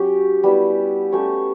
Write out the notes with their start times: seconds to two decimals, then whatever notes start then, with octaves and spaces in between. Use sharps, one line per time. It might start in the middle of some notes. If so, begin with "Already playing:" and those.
Already playing: F#3 C#4 G4
0.43 G3 B3 E4
1.12 A3 C#4 G4 C#5